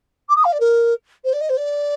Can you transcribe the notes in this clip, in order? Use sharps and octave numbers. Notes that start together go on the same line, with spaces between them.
D6
D#6
F5
D5
A#4
C5
D5
D#5
C5
D5